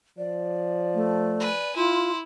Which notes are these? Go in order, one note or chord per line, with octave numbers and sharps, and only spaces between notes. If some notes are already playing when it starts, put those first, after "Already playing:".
F3 D5
A3
B4 G#5
E4 F4 C6